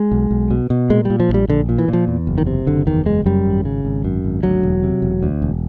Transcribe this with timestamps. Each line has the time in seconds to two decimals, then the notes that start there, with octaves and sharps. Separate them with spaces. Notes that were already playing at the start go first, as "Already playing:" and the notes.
Already playing: G#3
0.12 B1
0.31 B1
0.51 B2
0.70 B2
0.90 A#2 G#3
1.05 A#2 G3
1.20 F3
1.29 A#1
1.34 G3
1.48 A#1 D3
1.69 A#2
1.78 E3
1.88 A#2 F3
2.08 E2
2.27 F#1
2.38 D#3
2.47 C3
2.67 F#1 D3
2.87 E2 D#3
3.06 F#1 G#3
3.26 F#2 G3
3.46 G#1
3.65 C#3
3.85 G#1
4.05 F#2
4.24 G#1
4.43 D2 F#3
4.63 E1
4.83 C3
5.02 E1
5.23 D2
5.42 E1